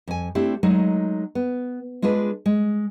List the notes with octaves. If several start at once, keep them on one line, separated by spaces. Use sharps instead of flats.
F2 G#5
A3 C4 D4 E4 G4
F#3 G#3 A3 D#4
B3
G#3 D4 F4 G#4 B4
G#3